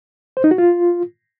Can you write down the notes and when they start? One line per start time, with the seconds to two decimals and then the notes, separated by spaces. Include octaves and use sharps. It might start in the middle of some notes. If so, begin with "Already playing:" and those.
0.37 C5
0.44 D#4
0.51 F#4
0.58 F4